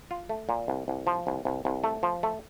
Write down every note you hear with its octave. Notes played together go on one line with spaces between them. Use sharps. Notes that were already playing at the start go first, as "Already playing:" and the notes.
F4
A3
A#2
C2
C2
F3
C2
C2
C2
A3
F3
A3